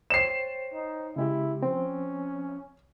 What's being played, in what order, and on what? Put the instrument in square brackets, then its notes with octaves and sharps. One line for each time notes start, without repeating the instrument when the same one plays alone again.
[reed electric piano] C5 C#5 G5 [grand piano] C7 E7
[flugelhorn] D#4
[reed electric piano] C#3 G#3 G4 [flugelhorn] E4
[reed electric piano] F3 C4 [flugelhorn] C#4